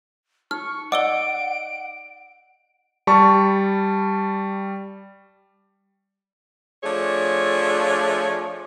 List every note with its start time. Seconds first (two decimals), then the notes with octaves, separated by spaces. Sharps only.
0.51 D#4 C#6 F6
0.92 D5 D#5 F#5 D6 E6 D7 G7
3.07 G3 A5 C#6
6.83 F3 A3 D4 G#4 C#5